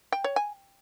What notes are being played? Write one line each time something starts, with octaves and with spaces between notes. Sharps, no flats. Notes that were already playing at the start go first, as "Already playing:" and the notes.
G5
C#5
G#5